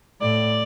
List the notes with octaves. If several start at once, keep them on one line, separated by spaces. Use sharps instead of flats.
A2 D5